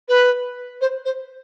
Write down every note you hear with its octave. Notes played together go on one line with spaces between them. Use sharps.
B4
C5
C5